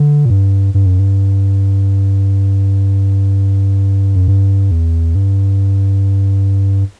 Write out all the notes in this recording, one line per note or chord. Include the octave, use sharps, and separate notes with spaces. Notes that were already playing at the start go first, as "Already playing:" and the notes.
Already playing: D3
A#2
G2
G2
F#2
G2
F#2
G2
E2
G2